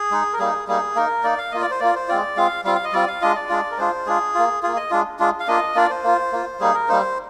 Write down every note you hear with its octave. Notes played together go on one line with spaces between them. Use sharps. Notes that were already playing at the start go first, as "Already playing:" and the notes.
Already playing: G#4
G#3 D#4
A#4
G3 A#3 D#4 G#4
G3 A#3 D#4 G#4
A#3 D#4 A#4
A#3 D#4 D5
F5
A#3 F4 D#5
D5
C5
A#3 F4 D5
C5
G#3 C4 F4 D5
G#3 C4 F4 F5
G3 C4 F4 F5
F5
D#5
G3 C4 F4 D5
F5
G#3 D4 F4 D#5
D5
G#3 D4 F4
A#4
G#3 D4 F4 C5
G#3 D4 F4 G#4
A#3 F4
A#3 F4 G#4
D#5
G#3 D4 F4
G#3 D4 F4
F5
A#3 D4 F4 D#5
A#3 D4 F4 D5
C5
A#3 F4
A#3 F4
G3 A#3 D#4 G#4
A#4
G3 A#3 D#4 C5